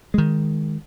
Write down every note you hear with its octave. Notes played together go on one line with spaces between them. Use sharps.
D#3 G#3